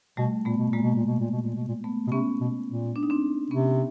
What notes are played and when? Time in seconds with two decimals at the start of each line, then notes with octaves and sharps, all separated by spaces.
0.17 B2 G3 A3
0.45 A#2 A3 B3
0.57 B2
0.70 A#2 G#3 A#3
0.81 B2
0.95 A#2
1.06 B2
1.19 A#2
1.31 B2
1.42 A#2
1.55 B2
1.68 A#2
1.84 A3 B3
2.07 B2
2.12 C3 B3 C#4
2.40 B2
2.67 A#2
2.96 D4
3.03 D#4
3.10 C4 D4
3.50 C3 B3 C#4